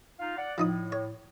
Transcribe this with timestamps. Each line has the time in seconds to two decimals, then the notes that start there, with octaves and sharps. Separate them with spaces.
0.19 D#4 F4 F5
0.37 D5 F#5
0.58 A2 F3 D#4 D#6
0.92 C#5